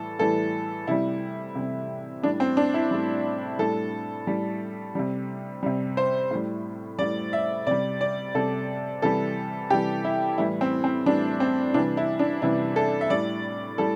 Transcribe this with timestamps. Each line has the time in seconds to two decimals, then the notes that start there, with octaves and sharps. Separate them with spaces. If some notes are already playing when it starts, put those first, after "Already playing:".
Already playing: A2 E3 G3 A4
0.19 A2 E3 G3 A4
0.87 C3 G3 E4
1.55 C3 G3
2.23 A2 G3 D4
2.40 C4
2.57 D4
2.74 E4
2.91 A2 G3
3.59 A2 G3 A4
4.27 A2 G3
4.95 C3 G3
5.63 C3 G3
5.97 C5
6.31 A2 G3
6.99 A2 G3 D5
7.33 E5
7.67 C3 G3 D5
8.01 D5
8.35 C3 G3 A4
9.02 C3 E3 G3 A4
9.70 C3 E3 G3 G4
10.05 E4
10.38 A2 E3 G3 E4
10.61 C4
10.84 C4
11.06 A2 E3 G3 D4
11.40 C4
11.74 C3 E3 G3 D4
11.97 E4
12.19 D4
12.42 C3 E3 G3 E4
12.76 A4
13.01 E5
13.10 A2 G3 D5
13.78 A2 G3 A4